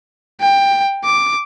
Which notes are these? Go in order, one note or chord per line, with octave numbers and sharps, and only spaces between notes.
G5
D6